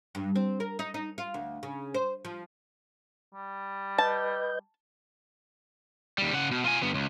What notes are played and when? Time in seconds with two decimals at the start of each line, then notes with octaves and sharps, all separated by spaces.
0.15 G2
0.35 C4
0.60 A#4
0.79 D#4
0.94 D#4
1.18 F4
1.34 D2
1.63 C#3
1.94 C5
2.25 F3
3.34 G3
3.98 B4 D#5 A5 G6
6.18 D#2 G3
6.33 C#3 F#5
6.51 B2
6.64 F4 G#5
6.82 G2 B3
6.94 C#2